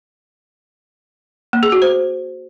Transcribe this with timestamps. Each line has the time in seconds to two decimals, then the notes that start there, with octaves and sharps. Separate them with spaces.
1.53 A#3
1.63 G#4
1.72 F#4
1.82 C5